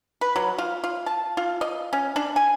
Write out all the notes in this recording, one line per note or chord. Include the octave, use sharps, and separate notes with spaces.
B4
F#3
F4
F4
A5
F4
D#5
C#4
D4
G#5